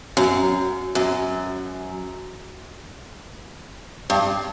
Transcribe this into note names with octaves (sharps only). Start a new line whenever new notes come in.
F#2
F#2
G2